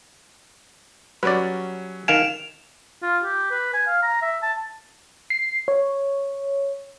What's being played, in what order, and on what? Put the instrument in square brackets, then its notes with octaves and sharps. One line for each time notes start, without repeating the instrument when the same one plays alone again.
[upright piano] F#3 G3 C#4 [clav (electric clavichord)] B4 D5
[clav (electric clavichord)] D#3 F5 G#5 [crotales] D7 E7 F7
[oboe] F4
G4
B4
G#5
F5
A#5
E5
A5
[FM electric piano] C7
C#5